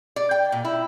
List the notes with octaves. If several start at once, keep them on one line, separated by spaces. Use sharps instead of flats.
D5
G5
A#2
E4